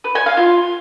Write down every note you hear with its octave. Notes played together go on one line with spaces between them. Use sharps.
B4
G#5
F5
F4